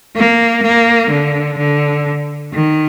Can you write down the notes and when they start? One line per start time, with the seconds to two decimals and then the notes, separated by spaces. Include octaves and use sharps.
0.16 A#3
0.63 A#3
1.11 D3
1.58 D3
2.54 D#3